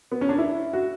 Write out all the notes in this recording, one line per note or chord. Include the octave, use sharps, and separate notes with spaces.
B3
C#4
D4
E4
F#4